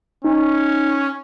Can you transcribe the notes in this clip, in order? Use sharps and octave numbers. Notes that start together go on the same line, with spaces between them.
C#4 D#4